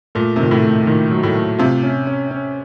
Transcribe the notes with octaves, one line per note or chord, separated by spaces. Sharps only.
A#2 A3
C3
A#2 D#3
A2
A3
A#2 D#3
F#3
A2
A3
C3 F4
C#4
C#4
C#4